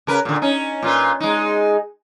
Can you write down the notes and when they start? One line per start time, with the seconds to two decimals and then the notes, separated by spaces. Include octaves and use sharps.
0.07 C#3 A#4 B4
0.25 A#2 D3
0.42 C#4 D#4
0.83 A#2 F4 B4
1.20 G#3 D#4